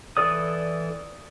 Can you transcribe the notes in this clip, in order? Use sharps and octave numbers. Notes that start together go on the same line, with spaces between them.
E3 A4 D5 D#6